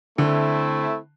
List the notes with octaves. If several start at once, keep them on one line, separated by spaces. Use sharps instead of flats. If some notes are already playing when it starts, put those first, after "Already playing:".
D3 A3 C4 E4